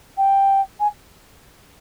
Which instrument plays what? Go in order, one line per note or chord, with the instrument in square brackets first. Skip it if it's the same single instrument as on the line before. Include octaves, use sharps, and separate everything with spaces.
[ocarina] G5
G#5